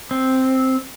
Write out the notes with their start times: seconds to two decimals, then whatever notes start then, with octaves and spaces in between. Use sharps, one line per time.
0.11 C4